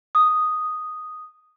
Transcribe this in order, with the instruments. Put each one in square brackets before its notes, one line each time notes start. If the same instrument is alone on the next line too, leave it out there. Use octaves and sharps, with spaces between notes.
[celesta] D#6